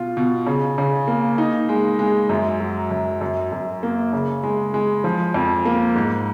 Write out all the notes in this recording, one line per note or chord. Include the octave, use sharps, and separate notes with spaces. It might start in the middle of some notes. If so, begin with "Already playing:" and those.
Already playing: B2 F4
B2
C#3
C#3
A#3
D#4
G#3
G#3
F#2
F#3
F#2
F#2
F#2
A#3
C#3
G#3
G#3
F3
F2
A#3
G#2